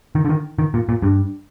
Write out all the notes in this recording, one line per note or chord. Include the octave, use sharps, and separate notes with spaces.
D#3
D3
D#3
D#3
A#2
A#2
G2